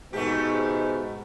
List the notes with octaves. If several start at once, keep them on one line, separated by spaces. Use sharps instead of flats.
G#2 B2 A3 G4